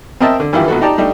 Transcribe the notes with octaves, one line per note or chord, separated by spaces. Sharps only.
C4 A#4 D#5 E5 A5
D3
G2 D#3 E3 G3 E4 F4
A#1 B3 F#4 A4
D#4 G4 D5 A5 A#5
G3 A3 D4 D#4 G4